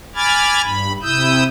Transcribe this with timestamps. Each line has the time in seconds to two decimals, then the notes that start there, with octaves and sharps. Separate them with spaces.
0.15 G#5 B5 D6 F6 G#6 A6
0.62 G2 B5
1.02 C3 E4 D#6 E6 G6